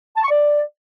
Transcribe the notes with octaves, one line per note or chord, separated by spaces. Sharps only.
A5
C#6
D5